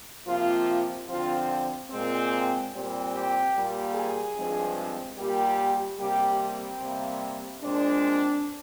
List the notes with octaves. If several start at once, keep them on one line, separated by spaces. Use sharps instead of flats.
C3 F3 A#3 F4
D3 F3 C4 F4
A#2 G#3 C4
A#2 G3 C4
G4
A#2 G3 A#3
G#4
G2 F3 G#3 C4
A#2 G3 A#3 G4
C3 G3 A#3 G4
C4
C3 G3 A#3
A#2 G#3 C4 D4